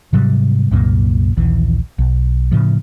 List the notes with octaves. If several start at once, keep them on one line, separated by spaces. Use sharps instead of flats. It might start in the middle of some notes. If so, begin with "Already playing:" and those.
G#2 C3 F#3 G3
C2 F#2 A#2 A#3
A#1 D#2 E3
B1
A2 C#3 F3